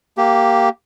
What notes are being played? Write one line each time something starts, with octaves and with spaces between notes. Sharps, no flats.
A#3 G4